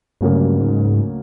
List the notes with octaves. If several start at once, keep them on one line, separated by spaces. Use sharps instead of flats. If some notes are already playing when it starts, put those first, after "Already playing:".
D2 G2 C#3 F#3 A#3 C#4
G#2